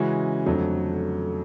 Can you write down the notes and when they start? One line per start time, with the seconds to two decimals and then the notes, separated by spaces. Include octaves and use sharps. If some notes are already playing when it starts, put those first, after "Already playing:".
Already playing: C#3 E3 G#3 C#4 F#4
0.46 F2 D3 F#3 A3